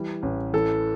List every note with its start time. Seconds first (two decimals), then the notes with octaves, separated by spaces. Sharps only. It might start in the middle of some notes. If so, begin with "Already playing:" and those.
Already playing: E3 G3
0.23 A1
0.53 E3 A4